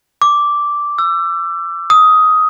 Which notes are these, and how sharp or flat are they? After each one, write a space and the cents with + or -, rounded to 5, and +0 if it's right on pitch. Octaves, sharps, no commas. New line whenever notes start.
D6 -5
E6 +30
D#6 +10